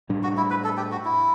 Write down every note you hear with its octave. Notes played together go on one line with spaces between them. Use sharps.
A2 G3 D4
F#4
E4
B4
A4
G4
F#4
E4